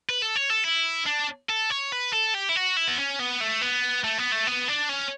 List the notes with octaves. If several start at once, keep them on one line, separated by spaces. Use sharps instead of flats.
B4
A4
C#5
A4
E4
D4
A4
C#5
B4
A4
G4
E4
F#4
E4
B3
C#4
B3
A3
B3
A3
B3
A3
B3
D4
C#4